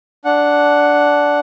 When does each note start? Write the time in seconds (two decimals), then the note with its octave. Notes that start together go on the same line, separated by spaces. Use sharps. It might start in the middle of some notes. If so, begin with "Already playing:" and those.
0.25 D4 F#5